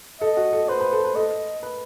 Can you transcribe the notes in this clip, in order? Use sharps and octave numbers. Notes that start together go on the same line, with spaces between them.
A4 D#5
F#4
A4
B4 C5
B4
A4
B4
A4 D#5
B4